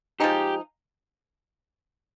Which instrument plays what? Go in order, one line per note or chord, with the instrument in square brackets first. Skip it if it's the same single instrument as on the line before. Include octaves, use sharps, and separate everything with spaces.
[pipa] F3 G#3 D#4 [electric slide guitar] G4